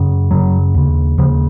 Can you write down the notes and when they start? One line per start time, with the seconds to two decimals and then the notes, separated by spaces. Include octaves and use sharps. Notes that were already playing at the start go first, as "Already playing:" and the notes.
Already playing: F#2 C#3
0.31 F#2 C#3 F#3
0.75 D#2 C#3
1.18 D#2 C#3 F3